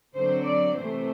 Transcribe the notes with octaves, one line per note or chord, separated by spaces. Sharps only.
D3 F#3 C4 C5
D5
C3 E3 A3 C4 C5